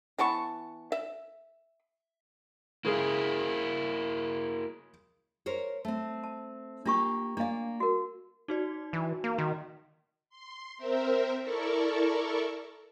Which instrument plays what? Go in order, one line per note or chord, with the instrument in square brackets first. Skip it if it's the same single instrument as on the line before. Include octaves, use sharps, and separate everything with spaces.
[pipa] E3 B3 A5 C#6
E5
[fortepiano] C#3 G#3 [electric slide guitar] A#3 E4
[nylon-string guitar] A#4 C5 C#5
A3 C4
[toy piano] A5
[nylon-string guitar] A#3 G4 [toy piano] D4 F4 C#6
[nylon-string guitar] A#3 D5 [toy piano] D4 F5
[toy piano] F#4 A#4
[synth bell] D#4 F#4 D5
[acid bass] E3
A#3
[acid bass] D#3 [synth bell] F#4
[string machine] C6
C4 A#4 C5 E5
E4 A4 A#4 D5 C#6